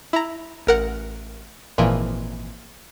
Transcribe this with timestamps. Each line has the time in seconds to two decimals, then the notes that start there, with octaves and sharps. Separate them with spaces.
0.13 E4 A#5
0.67 A1 A#4 F#5
1.78 G#1 A#2 E3 F3